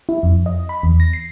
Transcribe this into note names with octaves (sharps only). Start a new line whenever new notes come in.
E4
F2
D#5
B5
E2
A#6
C7